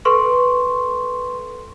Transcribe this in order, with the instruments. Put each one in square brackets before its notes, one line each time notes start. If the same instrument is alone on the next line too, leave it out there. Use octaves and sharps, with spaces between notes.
[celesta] A4 B4 C6 C#6